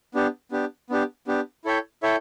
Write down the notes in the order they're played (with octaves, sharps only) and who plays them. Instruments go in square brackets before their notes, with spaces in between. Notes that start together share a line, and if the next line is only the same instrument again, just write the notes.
[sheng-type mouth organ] B3 D4 G4
B3 D4 G4
B3 D4 G4
B3 D4 G4
E4 A4 C#5 E5 G5
E4 A4 C#5 E5 G5